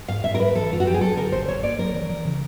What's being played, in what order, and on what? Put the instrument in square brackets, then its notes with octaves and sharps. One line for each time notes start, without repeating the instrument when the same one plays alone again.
[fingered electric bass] G#2 [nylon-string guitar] F5
[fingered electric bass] G#2 [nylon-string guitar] E5
[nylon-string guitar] A#4
[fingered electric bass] G3 [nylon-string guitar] B4
[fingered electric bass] E3 [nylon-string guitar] A4
[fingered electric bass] F#2 [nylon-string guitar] F4
[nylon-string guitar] F#4
[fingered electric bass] F3 [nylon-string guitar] G4
[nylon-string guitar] G#4
[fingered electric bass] F#3 [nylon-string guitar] A4
[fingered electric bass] D3 [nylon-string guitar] A#4
[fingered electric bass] G#1 [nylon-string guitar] C5
[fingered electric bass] G#1 [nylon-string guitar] C#5
[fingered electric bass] A#3 [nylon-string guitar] D5
[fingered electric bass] F#3 [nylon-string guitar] A#4
[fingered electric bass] E3
E3
C#3